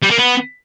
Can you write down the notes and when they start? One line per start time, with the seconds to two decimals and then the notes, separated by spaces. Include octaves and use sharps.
0.02 G3
0.10 A#3
0.18 B3